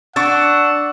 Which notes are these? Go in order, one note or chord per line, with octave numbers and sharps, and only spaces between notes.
D4 F#5 C#6 E6 A6